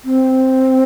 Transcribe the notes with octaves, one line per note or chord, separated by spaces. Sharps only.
C4